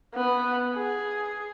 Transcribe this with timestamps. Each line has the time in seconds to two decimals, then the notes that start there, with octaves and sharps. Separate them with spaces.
0.14 B3
0.75 G#4